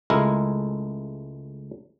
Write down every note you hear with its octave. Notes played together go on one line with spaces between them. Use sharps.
C#2 G#3 A3 E4 A#4